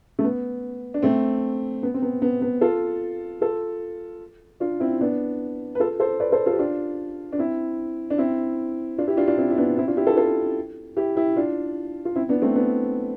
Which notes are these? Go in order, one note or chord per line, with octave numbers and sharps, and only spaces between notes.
A3
B3
D4
A3 C4
B3
C4
B3
B3
B3
F4 A4
F4 A4
D4 F4
C4 E4
B3 D4
B4
F4 A4
A4 C5
B4 D5
A4 C5
F4 A4
G4
D4 F4
D4
C4 E4
D4
C4 E4
D4 F4
E4 G4
D4 F4
D4 F4
C4 E4
E4
B3 D4
C4 E4
D4 F4
E4 G4
F4 A4
F4 A4
E4 G4
E4 G4
D4 F4
F4
C4 E4
B3 D4
A3 C4
B3 D4